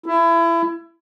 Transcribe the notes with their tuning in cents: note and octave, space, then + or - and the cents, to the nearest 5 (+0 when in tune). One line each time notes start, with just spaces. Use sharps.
E4 +25